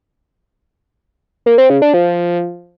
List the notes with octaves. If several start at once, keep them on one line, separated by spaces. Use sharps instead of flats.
A#3
C4
C#3
D4
F3